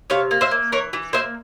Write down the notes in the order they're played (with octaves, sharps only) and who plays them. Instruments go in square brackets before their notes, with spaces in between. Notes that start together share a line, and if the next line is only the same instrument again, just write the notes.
[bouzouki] C3 C#5 F5
A#3
C5 E5
A#3
E3 A#4 C#5
E3
A#3 C5 E5